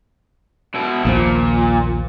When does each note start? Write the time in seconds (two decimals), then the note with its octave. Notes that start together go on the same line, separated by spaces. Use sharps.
0.75 B2 E4
1.05 A#1 D#2 A#2 F3